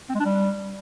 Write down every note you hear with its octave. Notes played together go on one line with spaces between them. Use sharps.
C4
G#3
D4
G3